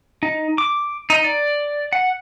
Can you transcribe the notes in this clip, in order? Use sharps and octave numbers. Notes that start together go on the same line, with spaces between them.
D#4
D6
D#4
D5
F#5